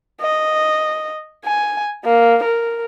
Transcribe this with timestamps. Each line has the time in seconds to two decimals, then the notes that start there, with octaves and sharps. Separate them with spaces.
0.21 D#5
1.45 G#5
2.05 A#3
2.44 A#4